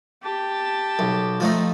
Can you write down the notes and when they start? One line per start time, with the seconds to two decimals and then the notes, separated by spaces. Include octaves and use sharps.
0.23 G4 A5
0.99 B1
1.40 F3 A3 D#4